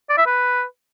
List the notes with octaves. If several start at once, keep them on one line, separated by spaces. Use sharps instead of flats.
D5
E5
B4